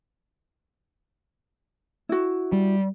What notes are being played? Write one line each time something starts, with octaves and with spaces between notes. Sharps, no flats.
E4 F#4
G3